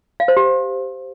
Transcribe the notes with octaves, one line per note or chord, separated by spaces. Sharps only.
F5
C5
G4